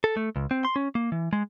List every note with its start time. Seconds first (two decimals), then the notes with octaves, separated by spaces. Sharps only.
0.04 A4
0.17 A3
0.36 C#2
0.51 C4
0.65 C6
0.76 C#4
0.95 A#3
1.12 E3
1.33 G#3